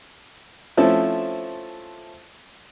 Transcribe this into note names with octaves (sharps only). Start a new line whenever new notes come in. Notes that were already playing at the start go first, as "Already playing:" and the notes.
F3 A3 C4 C#4 E4 A5